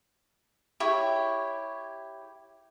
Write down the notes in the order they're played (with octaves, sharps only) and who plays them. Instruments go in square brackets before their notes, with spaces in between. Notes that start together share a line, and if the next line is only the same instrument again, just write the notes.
[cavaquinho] E4 G4 C#5